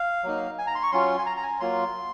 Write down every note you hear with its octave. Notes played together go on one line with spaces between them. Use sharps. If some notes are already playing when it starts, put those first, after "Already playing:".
Already playing: F5
F#3 A#3 D#4
G#5
A#5
C6
C#6
F#3 C#4 F4 C6
G#5
A#5
A#5
G#5
F#3 A#3 F4 C6